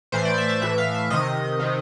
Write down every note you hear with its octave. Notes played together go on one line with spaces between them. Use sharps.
A2 E3 C5
D5
E5
E5
A2 E3 E5
F5
E5
C3 D#3 D#5
C3 D#3